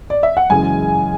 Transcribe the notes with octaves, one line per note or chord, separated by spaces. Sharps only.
D5
E5
F#5
F#2 C#3 E3 G#3 G#5